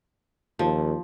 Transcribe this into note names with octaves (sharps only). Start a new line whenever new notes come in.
D#2 F3